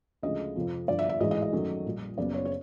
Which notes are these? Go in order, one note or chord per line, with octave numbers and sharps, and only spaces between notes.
D2 C#3 F3 G#3 D#5
F2 C3 F3
G2 D3 F3 D5
E5
E5
A1 G#2 E3 G#3 D#5
D#5
D#5
F#2 D#3 F#3 A3
A#1 A#2 G3
F#1 F#2 C#3 F#3 B3 D5
C#5
C#5